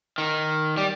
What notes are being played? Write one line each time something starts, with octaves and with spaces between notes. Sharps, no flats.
D#3
G3